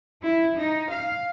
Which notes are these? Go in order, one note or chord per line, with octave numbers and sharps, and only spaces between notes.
E4
D#4
F5